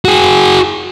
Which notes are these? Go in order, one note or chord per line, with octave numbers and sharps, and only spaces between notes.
F#4 G#4